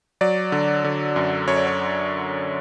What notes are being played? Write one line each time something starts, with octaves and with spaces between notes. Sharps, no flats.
F#3 D5
D3
D3
F#2
F#2 C#5
D5
C#5